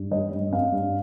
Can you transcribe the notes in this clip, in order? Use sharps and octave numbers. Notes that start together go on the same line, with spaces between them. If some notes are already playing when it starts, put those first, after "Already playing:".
Already playing: G2
G3 D#5
G2
C4 F5
G2